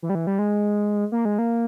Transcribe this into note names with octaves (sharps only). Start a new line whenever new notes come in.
E3
G3
E3
G3
G#3
A#3
G#3
A#3